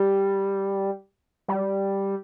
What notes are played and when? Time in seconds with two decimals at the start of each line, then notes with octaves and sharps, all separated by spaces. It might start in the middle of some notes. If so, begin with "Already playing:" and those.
Already playing: G3
1.48 G3